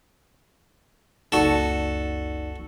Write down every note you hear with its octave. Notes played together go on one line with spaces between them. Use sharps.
F#1 C#2 D#4 F#4 A4 D5 C#7